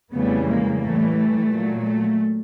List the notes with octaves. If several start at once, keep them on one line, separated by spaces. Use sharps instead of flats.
F2 C#3 E3 G3 A3 B3
G#3 A#3
A2 E3 G3 A3
A3
A#2 F#3
A3